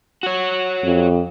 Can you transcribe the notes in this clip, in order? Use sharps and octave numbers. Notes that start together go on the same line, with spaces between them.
F#4 C#5
F2